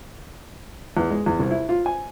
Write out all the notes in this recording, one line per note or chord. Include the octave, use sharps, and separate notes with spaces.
E2
G#3
E2
C2
E4
F4
G#5